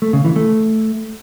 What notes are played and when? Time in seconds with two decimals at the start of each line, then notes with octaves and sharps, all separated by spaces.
0.02 A3
0.13 C#3
0.25 E3
0.36 A3